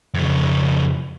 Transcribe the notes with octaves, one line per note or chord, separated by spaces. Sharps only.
F2 C#3